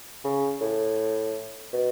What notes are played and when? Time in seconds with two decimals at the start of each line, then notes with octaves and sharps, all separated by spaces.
0.24 C#3
0.61 A2
1.73 B2